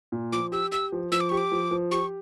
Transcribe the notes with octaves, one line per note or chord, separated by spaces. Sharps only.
A#2
F3 D6
G4 E6
G4 E6
F3
F3 E6
D6
G4 C#6
D6
F3
F3
G4 C#6